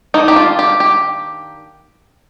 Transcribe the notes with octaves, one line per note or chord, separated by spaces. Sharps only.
D#3 G3 A#3 D4 D#4
G4
F4
G4
G4